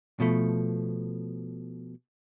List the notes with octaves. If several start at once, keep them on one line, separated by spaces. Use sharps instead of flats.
B2 F3 A3